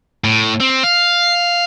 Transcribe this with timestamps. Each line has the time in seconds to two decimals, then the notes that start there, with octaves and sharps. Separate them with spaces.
0.24 A2
0.60 C4
0.84 F5